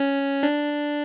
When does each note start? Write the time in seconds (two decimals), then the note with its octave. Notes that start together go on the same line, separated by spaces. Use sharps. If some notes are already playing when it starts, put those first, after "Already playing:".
Already playing: C#4
0.43 D4